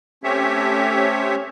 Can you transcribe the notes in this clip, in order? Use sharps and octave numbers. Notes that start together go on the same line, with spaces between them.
A3 C4 C#4 G4 C#5 E5